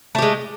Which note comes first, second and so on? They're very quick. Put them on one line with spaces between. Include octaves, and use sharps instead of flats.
A3 G4 G#3